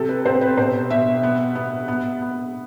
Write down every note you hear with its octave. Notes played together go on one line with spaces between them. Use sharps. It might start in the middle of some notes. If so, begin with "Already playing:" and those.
Already playing: C3 A4
B4
C4 C5
B4
B2 C5
B2 E5
B3
B3
B3
B3